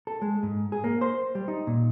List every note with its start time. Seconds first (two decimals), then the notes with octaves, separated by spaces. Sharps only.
0.07 A4
0.22 G#3
0.43 G#2
0.72 G#4
0.84 A#3
1.01 C5
1.35 G3
1.48 D#4
1.67 A#2